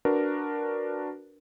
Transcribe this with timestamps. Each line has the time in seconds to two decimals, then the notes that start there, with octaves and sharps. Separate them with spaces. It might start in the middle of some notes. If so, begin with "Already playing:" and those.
0.05 D4 F#4 A#4 B4